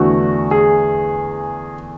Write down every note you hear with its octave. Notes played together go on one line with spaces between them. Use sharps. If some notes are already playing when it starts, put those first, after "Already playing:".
Already playing: E2 D3 A3 F#4
G#4